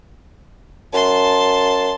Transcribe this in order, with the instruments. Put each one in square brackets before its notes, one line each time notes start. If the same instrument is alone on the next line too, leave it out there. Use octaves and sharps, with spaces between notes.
[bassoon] F#2 [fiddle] A5 C6